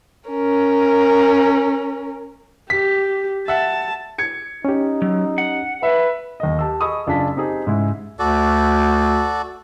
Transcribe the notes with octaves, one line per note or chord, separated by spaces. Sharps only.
C#4 A#4
G4 B6
E5 F#5 A5
G#6 C#7
C#4 D#4 G4
F#3
F#5
B4 E5
D#2 A4 D#5
G4 A5 E6
G#4 D#5 B5 C#6 D#6 E6
F#1 D4 F4 G#4 A5 B6
C4 D#4 G4 G#4
G#2 C#3 G#3 E4
D2 F#4 A4 D5